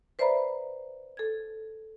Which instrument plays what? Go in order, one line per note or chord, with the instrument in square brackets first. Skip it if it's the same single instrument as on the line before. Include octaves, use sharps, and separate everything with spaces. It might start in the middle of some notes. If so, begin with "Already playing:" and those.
[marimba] B4 C5 D5 E5 A#5 B5
A4 G#6